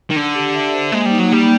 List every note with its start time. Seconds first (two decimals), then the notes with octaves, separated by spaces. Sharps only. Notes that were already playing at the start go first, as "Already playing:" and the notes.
0.10 D#3
0.16 D3 D4
0.35 G4
0.55 E5
0.73 C5
0.92 G#3 A#3
1.06 G3 D#4
1.19 F#3
1.30 G3 A#3